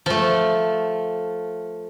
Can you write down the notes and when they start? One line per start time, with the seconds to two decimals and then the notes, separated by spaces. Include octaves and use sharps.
0.06 F3 A3